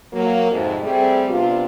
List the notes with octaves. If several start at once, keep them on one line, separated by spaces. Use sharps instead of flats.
F#3 A#3
F2 G#2 C3
G3 A3 C4 G4 G#4
C3 B3 D4 F4